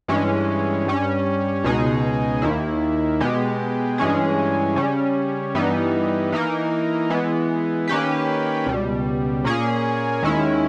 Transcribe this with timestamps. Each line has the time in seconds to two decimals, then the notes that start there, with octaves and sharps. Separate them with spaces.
0.08 G2 E3 G#3 C#4
0.86 G2 G3 C#4
1.64 C#2 B2 G#3 D#4 G#4
2.42 D#2 D#3 A#3 E4
3.20 B2 G#3 B3 G4
3.98 G2 E3 G#3 C#4 G#4
4.76 C#3 G3 C#4
5.54 G2 E3 G3 B3 D#4
6.32 E3 A#3 D#4 A#4
7.10 E3 G#3 B3
7.88 D#3 A#3 C#4 G4 B4
8.66 C#2 B2 G3
9.44 A#2 A#3 C#4 G#4
10.22 D#2 D#3 G#3 C#4 E4